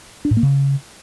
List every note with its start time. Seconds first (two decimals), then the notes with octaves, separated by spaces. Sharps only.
0.25 D4
0.31 A2
0.37 A#3
0.43 C#3